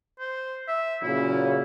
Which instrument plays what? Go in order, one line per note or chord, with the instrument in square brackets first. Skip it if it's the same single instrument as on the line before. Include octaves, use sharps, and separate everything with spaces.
[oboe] C5
E5
[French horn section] A#2 C#3 F#3 [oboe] E4